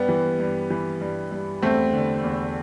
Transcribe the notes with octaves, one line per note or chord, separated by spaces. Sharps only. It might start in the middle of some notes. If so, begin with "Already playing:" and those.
Already playing: G2 G3 B3
E3
G2
E3
G2
G2
E2 A3 C4
D3
E2